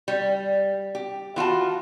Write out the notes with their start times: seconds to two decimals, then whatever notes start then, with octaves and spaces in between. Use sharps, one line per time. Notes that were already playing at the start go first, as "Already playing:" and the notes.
0.08 G3
0.95 G4
1.36 E3 F4 F#4 A5